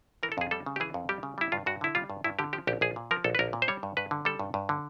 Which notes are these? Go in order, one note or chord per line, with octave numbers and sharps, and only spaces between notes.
E3 A#4
A4
F2 G#4
G3 A4
C#3
G4
E3 G#4
F2
G3 G4
C#3
G3 E4
G2 F4
G2 F#4
D3 E4
G3 F4
G2
G2 E4
D3 G4
F3 G4
A#1 G4
A#1 G#4
A#2
F3 A#4
A#1 A4
B4
A#1 A#4
A#2
C5
G3 C#5
G2
G2 B4
D3
G3 A4
G2
G2
D3